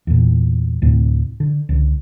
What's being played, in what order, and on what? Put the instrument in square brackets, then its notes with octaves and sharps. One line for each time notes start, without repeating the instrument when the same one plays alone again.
[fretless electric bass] E2 A#2
D2 A2 C3
D3
C#2 D3